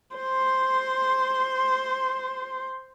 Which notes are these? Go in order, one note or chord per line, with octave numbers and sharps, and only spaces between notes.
C5 C6